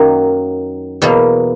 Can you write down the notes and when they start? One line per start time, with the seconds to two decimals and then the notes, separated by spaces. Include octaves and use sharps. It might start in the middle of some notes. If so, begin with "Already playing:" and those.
Already playing: F#2 D#3 F#3 A#3
1.02 E2 B2 F#3 A#3